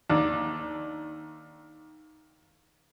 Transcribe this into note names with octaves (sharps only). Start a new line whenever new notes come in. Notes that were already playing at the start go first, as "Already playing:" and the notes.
D#2 D4